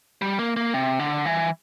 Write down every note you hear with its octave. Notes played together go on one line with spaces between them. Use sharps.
G3
A#3
A#3
C3
D3
E3